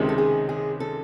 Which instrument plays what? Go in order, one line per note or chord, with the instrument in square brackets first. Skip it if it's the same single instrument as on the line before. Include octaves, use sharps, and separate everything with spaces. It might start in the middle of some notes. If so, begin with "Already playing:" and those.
Already playing: [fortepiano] C#2 C3 D#3 G#3
[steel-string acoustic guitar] A4
G#4
G#4
A4